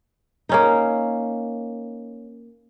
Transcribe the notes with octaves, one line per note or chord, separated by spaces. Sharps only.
A#3 C#4 D#4